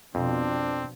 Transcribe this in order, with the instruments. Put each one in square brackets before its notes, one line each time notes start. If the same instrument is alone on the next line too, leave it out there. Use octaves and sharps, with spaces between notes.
[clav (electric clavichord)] F2 [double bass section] B2 F3 [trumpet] C4 [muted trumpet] D4